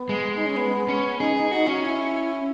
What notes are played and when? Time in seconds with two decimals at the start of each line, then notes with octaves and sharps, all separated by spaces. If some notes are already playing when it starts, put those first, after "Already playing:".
Already playing: B3
0.09 G#3
0.35 D#4
0.46 C#4
0.57 B3
0.89 C#4
1.19 D#4 G#4
1.36 D#4
1.51 D#4 F#4
1.67 C#4 F#4
1.83 E4